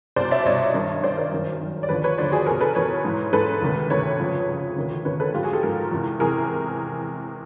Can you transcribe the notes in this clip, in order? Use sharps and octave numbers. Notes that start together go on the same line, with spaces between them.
C2 B2 C5 D5
D5 E5
C2 B2 C#5 D#5
G2 D#3
G2 D#3 C5 D5
A#4 C5
F#2 D#3
F#2 D#3
D5
D#2 D3 F3 B4 C#5
B4 C#5
D#2 D3 F3 C5 D5
F#4 G#4
E2 B2 G#4 A#4
A4 B4
E2 B2 B4 C#5
G#2 E3
G#2 E3 A4 B4
D2 C3 D#3
D2 C3 D#3 B4 C#5
F2 C#3 F3
F2 C#3 F3
D2 C3 D#3
D2 C3 D#3 B4 C#5
A4 B4
G#2 F3 F4 G4
F#4 G#4
G4 A4
G#2 F3 G#4 A#4
E2 C3 E3
E2 C3 E3 G#4 A#4